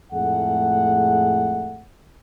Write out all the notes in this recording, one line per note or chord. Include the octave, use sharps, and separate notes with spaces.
F2 A2 G#3 A3 G#4 F#5